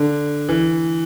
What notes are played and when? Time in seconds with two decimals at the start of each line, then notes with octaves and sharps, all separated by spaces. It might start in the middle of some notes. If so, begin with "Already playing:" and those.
Already playing: D3
0.49 E3